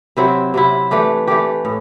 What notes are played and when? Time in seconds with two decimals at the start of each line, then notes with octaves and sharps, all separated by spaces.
0.17 C3 F#3 C4 E4
0.54 C3 F#3 C4 E4
0.91 E3 A3 D4 G4
1.27 E3 A3 D4 G4
1.65 A2